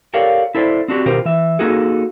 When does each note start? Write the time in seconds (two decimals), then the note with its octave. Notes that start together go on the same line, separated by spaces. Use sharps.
0.14 G4 A4 A#4 C#5 D5 F5
0.55 E4 A4 C5 D5
0.88 C4 D4 F#4 G4
1.06 B2 D#3 F4 G4 A#4 C5
1.25 E3 E5
1.59 A#3 D#4 F#4 G#4 A4